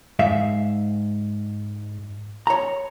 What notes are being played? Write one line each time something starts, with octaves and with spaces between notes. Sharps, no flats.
G#2 E5 F5
C#5 A#5